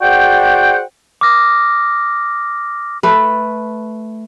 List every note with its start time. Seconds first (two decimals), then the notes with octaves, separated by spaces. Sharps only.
0.01 F#4 G#4 C5 D5 F#5 G5
1.21 D6 D#6 F6 A#6
3.03 A3 B4